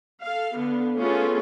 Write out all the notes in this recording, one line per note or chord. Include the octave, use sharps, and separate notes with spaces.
A4 F5
D3 B3
A3 B3 C#4 F4 G#4 A4